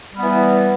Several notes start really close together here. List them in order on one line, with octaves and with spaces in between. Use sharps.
G3 B3 E3